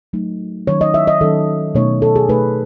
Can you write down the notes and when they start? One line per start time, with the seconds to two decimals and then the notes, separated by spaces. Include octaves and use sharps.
0.13 F#3 A3 D#4
0.67 D#3 F#3 C#4 C#5
0.81 D#5
0.94 E5
1.07 D#5
1.21 D#3 F#3 C#4 A4
1.75 B2 A3 D#4 C#5
2.02 A4
2.16 G#4
2.28 B2 A3 D#4 B4